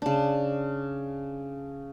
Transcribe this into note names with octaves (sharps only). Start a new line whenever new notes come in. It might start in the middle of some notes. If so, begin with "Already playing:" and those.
C#3 D4